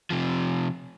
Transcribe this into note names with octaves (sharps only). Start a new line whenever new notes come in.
C3 F3